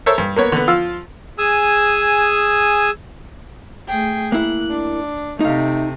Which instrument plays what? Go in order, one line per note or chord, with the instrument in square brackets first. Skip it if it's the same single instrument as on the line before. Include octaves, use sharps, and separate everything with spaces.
[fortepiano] A4 A#4 C5 C#5 E5
G2
A#3 B3 C#5
D3 B3
F3 F4 F5 E6
[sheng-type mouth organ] G#4 G#5 D#6 E6
[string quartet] A3 G#4 G5
[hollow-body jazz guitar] A#3 E4 [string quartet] F#6
[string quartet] D4
[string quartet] C3 A3 [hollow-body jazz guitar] D#4 F5